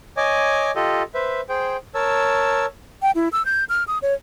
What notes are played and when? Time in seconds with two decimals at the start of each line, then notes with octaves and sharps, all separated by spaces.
0.17 C#5 D#5 G#5 D6
0.76 F4 G4 A4 D#5
1.14 B4 C5 E5
1.49 G#4 C5 G5
1.95 A#4 C#5 A5 E6
3.02 G5
3.15 E4
3.32 E6
3.45 G6
3.69 F6
3.88 D#6
4.02 C#5